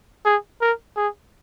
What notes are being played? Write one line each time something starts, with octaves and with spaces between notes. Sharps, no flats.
G#4
A#4
G#4